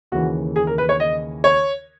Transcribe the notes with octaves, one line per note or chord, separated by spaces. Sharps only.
D#2 C#3 E3 F#4
G#4
A#4
B4
C#5
D#5
C#5